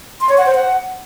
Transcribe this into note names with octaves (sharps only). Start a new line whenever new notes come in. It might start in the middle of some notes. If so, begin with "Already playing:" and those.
C6
C#5
F#5
C5
F#5